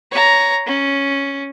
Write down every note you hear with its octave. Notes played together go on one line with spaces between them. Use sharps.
C#5 A#5
C#4